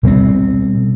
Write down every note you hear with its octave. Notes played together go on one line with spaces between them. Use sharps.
B2 G3 G#3 C4